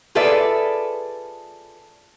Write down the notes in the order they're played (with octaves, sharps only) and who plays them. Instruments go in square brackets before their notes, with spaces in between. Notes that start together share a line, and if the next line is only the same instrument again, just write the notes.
[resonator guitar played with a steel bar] F4 G#4 A4 B4 D5 E5